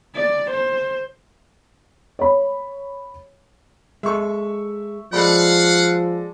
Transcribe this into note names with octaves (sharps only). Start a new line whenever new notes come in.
D5
C5
C#5 B5
G#3 A4 E5 C#6
F3 G#3 A4 D5 F5 F#5 B5